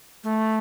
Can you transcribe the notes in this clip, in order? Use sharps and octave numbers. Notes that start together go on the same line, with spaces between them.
A3